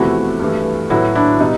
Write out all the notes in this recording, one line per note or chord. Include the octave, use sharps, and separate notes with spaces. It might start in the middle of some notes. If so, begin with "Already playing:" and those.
Already playing: E2 C3 F3 A3 E4 F#4
G2 E3 A3
A2 F#3 B3 E4 F#4
D4 E4
B2 G3 D#4